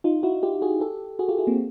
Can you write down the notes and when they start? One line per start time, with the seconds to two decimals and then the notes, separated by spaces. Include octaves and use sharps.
0.04 D#4 F4
0.23 E4 F#4
0.43 F4 G4
0.62 F#4 G#4
0.80 G4 A4
1.19 F#4 G#4
1.29 F4 G4
1.38 E4 F#4
1.47 A#3 C4